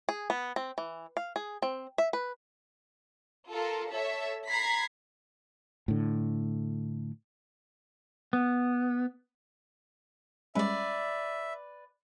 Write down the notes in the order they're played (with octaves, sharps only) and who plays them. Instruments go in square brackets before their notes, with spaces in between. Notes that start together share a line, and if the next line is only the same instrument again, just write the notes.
[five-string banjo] G#4
B3
C4
E3
F5
G#4
C4
E5
B4
[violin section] F4 A4 A#4
A4 C#5 E5
A#5 B5 G#6 B6 C7
[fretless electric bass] A2 D3
[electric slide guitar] B3
[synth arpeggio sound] G3 G#3 C#4 [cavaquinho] B4 D5 [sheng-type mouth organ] E5